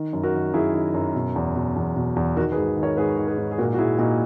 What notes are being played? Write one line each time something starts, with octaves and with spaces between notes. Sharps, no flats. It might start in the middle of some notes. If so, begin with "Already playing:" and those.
Already playing: D#3
F#2
F#4 A#4
D#3
F#2 E4 G#4
D#3
F#2
B2
E2
B2
E2
B2
E2
D#3 F#4 A#4
G#4 B4
G#2
D#3
A#4 C#5
G#2 G#4 B4
D#3
G#4 B4
G#2
G#4
A#2 F#4 A#4
F#4
A#2 E4 G#4
A#2 D#4 F#4